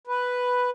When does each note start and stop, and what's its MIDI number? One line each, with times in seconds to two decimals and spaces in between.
0.07 0.70 71